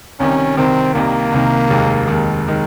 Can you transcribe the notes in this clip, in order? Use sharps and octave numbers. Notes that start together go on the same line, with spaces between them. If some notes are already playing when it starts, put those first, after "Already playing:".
C2 C3 D#3 C#4
C2 C3 D#3 C4
C2 C3 D#3 A#3
C2 C3 D#3
F1 D#2 D#3 G#3
F1 D#2 D#3 G#3
D#3 G#3